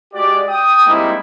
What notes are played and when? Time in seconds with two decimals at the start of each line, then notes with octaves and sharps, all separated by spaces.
0.14 G#3 F#4 G4 D5
0.48 G5 D#6
0.86 G3 G#3 A#3 C4 D#4 E4